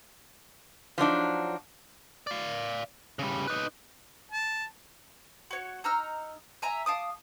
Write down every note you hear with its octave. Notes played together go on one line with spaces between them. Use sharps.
F3 F#3 D4 D#4
D5 F5
C#3 G3
D#4 B4
A5
F#4 C#5
D#4 A#5 E6 F6
E5 G#5 A#5
F5 A5 D6 D#6